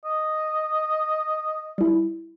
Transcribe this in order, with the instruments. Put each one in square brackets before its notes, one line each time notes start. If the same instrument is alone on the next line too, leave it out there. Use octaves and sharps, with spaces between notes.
[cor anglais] D#5
[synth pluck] G3 E4